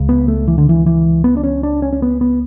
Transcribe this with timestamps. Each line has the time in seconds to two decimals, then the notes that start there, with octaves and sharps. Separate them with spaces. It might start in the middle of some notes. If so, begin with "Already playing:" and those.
Already playing: C#2 C#3
0.09 B3
0.28 A3
0.48 E3
0.58 D3
0.69 E3
0.86 E3
1.24 B3
1.37 D4
1.44 C#4
1.63 D4
1.82 C#4
1.93 C#4
2.02 B3
2.21 B3